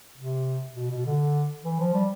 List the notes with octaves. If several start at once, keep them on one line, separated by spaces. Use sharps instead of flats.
C3
B2
B2
D3
E3
F3
G3